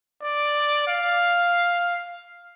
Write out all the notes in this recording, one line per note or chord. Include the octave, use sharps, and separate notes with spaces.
D5
F5